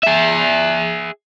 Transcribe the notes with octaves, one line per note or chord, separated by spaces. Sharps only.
G#4 E5